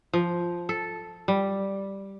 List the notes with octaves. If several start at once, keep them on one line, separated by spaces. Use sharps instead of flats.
F3
A4
G3